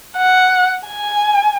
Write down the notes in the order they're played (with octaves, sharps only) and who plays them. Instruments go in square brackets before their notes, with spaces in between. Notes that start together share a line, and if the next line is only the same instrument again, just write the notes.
[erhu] F#5
G#5